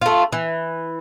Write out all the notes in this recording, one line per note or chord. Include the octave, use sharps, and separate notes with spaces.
A3 F4
E3